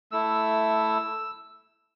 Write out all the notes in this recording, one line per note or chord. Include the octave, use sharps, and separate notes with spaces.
A3 E4 E6